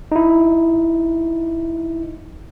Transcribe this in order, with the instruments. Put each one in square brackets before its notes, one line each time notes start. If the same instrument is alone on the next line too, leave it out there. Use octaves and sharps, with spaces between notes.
[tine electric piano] D#4 E4